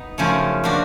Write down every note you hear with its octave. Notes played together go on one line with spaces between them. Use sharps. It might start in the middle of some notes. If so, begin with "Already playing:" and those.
Already playing: B3 D#4
F#2 C#3 F3 A3 C#4
F3 A#3 D4 F#4